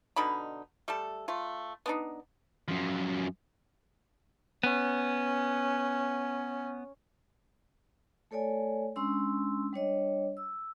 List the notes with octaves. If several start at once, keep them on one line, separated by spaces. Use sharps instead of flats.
B2 D3 D#4 B5
G3 A3 A4
A3 F4
B3 D4 D#4
F#2 F3
B3 C#4
A3 A4 C#5 D5 G#5
G#3 C#4 D4 C6 E6
G3 D4 C#5 D#5
E6